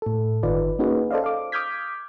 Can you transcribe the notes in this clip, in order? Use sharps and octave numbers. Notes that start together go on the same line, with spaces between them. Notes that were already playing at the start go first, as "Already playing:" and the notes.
A2 A4
G1 D#3 D#4 F4 B4 D5
A#3 C#4 D#4 F#4 G#4 B4
A4 C5 D5 D#5 F5
F5 D6
D6 D#6 F6 G6 G#6 B6